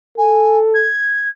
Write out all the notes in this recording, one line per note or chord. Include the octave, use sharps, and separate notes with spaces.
A4 G#5
G#6